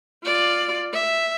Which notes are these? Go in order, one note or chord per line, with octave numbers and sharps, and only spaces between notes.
F4 D5
E5